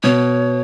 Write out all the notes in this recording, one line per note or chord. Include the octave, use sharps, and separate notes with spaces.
B2 C#5